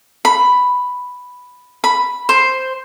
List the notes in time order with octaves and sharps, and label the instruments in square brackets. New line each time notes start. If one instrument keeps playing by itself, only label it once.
[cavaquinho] B5
B5
C5